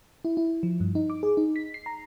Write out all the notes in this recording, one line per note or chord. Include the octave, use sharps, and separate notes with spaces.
E4
E4
F3
G2
D#4
D6
G#4
D#4
B6
C7
A#5